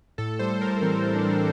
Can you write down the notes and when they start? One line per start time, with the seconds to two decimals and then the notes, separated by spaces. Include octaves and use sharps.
0.18 A2 A4
0.39 G3 C5
0.61 A2 A#4
0.82 E3 C4
1.03 A2
1.15 D4
1.25 G3 D4